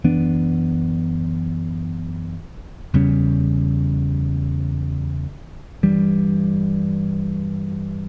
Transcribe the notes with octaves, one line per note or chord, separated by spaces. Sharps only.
F#2 E3 B3 D4
E2 C#3 G3 C#4
G2 E3 G3